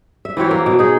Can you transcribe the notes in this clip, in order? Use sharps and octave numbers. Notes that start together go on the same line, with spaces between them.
E5
E3 C4 F#4 C#5
A#3
B2
D#4 G#4